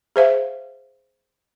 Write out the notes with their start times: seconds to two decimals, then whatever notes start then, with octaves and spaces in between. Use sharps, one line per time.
0.16 G#4 C5 E5 F5